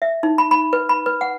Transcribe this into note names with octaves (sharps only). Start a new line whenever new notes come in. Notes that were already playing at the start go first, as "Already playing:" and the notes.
E5
D#4
B5
B5
B4
B5
B4
F#5